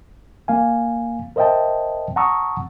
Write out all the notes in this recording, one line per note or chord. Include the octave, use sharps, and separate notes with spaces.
A#3 F5 G#5
A#4 C5 D#5 E5 G5 A5
F#5 A5 A#5 C#6 D#6 E6